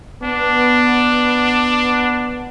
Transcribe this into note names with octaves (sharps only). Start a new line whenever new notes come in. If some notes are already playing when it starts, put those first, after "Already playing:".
B3 D4